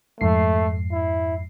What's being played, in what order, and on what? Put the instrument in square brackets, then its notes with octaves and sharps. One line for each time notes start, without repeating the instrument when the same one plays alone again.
[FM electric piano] F2 G#2 C7 [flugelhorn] A3
[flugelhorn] E4